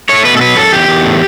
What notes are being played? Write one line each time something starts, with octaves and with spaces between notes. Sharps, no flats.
A3 C#5
B2 B4
A4
F#3 B4
F#2 A4
E2 G4
E2
A2